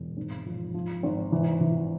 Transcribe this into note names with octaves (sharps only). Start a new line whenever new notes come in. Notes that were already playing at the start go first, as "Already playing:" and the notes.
Already playing: E1
G#1
F3
F3
G#1
E3
E3